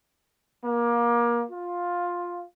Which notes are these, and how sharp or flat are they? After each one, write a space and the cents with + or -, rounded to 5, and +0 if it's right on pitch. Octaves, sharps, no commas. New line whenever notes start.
A#3 +25
F4 +10